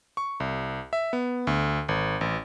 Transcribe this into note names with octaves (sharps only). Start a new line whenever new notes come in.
C#6
C2
E5
B3
D2
G#1
A1